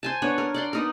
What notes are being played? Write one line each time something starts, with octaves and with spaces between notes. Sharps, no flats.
C5 G#5 A5
B3 D4 C#5
A#4
D5 F#5 C6
B3 D#4 A#4